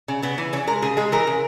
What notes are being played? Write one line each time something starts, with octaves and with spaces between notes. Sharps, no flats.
C#3
C#3 B3
E3
C#3 C#4
G#3 A#4
C#3 G#4
G#3 G#4
E3 A#4
C#3